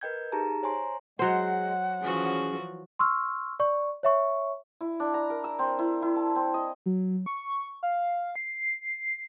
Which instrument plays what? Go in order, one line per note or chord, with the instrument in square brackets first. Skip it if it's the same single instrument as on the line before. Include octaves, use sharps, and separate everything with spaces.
[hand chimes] A#4 B4 D#5 G5 G6 G#6
D#4 G4 G#4 A5 A#5
C5 C#5 G#5 A#5 C6
[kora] F#3 C5 [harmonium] G#3 [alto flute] F#5
[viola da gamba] E3 F3 F#4 [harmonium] C#4 G#4
[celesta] C6 C#6 E6 F6
D5 C#6
C#5 E5 C#6
[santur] E4
D4
A#5
A#4
E6
C4
E4
E4
A5
C4
D#5
[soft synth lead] F#3
C#6
F5
C7